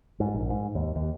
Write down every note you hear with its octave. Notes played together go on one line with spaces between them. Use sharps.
G#2
A#1
G#2
D#2
D#2